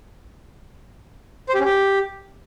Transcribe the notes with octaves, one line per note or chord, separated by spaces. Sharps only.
C5
G4
C#4
G4